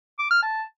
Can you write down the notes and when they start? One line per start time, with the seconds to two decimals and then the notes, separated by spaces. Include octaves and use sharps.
0.19 D6
0.31 F6
0.42 A5